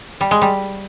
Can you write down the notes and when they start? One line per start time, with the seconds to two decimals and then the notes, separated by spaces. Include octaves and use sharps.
0.21 G3
0.31 G#3
0.42 G3